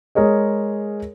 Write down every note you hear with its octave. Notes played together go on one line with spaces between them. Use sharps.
G#3 G#4 A#4 C#5 D#5